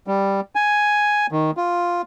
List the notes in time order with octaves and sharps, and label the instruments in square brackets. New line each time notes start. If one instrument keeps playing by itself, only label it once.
[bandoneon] G3
G#5
D#3
F4